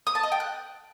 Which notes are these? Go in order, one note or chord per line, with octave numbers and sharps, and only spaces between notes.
D#6
A5
D#5
G5
F#6